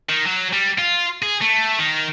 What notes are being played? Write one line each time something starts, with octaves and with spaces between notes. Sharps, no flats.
D#3
F#3
G3
F4
G#4
A3
D#3